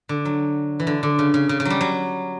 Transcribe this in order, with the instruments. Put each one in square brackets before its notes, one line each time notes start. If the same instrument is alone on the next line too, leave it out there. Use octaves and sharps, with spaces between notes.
[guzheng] D3
F#3
E3
D3
D3
C#3
C#3
C#3
C#3
F#3
G3
F#3